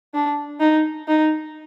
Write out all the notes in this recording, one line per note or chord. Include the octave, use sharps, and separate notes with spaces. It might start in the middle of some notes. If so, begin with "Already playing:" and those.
D4
D#4
D#4